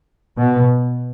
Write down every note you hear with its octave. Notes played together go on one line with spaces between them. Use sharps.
B2